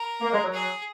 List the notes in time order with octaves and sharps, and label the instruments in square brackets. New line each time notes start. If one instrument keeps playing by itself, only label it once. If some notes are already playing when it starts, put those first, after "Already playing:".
Already playing: [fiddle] A#4
[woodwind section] A#3
G#3
F#3
[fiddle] G#4